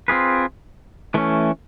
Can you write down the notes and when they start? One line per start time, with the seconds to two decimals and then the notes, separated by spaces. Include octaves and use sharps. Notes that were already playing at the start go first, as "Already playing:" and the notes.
0.08 C4 F4 G#4 B4
1.14 E3 A3 C#4